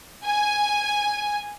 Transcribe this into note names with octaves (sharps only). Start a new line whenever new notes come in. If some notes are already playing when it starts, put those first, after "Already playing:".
G#5